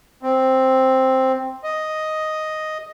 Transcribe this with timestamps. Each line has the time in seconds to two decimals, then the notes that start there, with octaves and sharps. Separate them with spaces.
0.23 C4
1.64 D#5